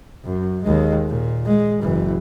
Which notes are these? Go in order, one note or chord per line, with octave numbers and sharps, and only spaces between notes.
F#2
D#2 G#3
A#2
G#3
F#1 E3